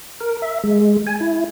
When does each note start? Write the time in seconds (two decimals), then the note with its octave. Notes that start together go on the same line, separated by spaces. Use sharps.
0.20 A#4
0.42 E5
0.64 G#3
1.06 G#5
1.21 E4